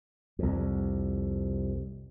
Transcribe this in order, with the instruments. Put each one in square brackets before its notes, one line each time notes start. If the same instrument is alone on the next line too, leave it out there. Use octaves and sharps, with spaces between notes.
[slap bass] C2 F2